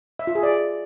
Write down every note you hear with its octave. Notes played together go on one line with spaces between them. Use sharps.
E5
F4
G#4
D5